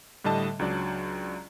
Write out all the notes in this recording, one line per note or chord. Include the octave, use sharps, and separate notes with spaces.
A2 D3 G3 D#5 A5
C#2 F#3 D4 D5